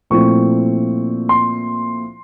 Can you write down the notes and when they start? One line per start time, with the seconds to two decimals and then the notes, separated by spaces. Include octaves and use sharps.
0.10 A#2 F3 A3 C4 E4 C#6
1.29 C6